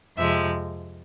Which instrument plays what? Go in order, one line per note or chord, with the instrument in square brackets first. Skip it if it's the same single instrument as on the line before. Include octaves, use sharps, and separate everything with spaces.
[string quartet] F2 C3 F3 G#3 E5